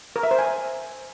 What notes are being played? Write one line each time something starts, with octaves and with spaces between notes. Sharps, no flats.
A#4
E5
C5
G#5